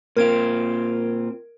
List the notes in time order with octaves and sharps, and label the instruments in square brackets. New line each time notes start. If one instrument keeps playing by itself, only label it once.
[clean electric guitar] A#2 C4 F4 [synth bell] A#4 G#6 D7